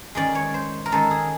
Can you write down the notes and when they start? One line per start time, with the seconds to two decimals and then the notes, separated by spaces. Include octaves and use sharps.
0.15 D#3 G#3 C#4 D5
0.35 C#5
0.54 C5
0.86 A#4
0.92 D#3 G#3 C#4 A4
1.11 G#4